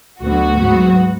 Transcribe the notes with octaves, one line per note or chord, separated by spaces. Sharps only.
D2 D3 F#3 B3 F#4
G#2 F#3 B3